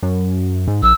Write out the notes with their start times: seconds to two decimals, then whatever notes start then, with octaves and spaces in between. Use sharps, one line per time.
0.03 F#2
0.68 G#2
0.83 A#1 E6